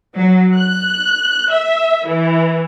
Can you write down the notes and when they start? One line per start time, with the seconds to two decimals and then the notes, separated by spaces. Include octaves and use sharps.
0.15 F#3
0.57 F#6
1.51 E5
2.06 E3